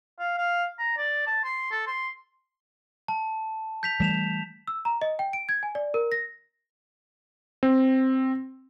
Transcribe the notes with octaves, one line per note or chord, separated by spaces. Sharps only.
F5
F5
A#5
D5
A5
C6
A4
C6
A5
G6 B6 F7
E3 G3 A3 B6 E7 F7
E6
A#5
D#5
G5
D7
G#6
G#5
D5
A#4
A#6
C4